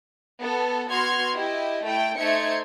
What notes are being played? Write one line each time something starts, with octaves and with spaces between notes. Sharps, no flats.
B3 A4
B3 F#4 C6 F6 G#6
E4 G4 D#5
A3 E4 G5
A3 D#4 C5 E5 G#6 C#7